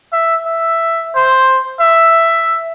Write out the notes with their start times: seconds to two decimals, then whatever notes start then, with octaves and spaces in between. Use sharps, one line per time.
0.13 E5
0.46 E5
1.16 C5
1.80 E5